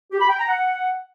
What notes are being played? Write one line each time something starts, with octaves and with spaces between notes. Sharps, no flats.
G4
B5
G5
A#5
F#5